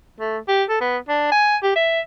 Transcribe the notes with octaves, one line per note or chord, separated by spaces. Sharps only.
A3
G4
A4
B3
D4
G#5
G4
E5